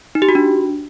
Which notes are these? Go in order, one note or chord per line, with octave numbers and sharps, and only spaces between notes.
D#4
G4
F#4
D4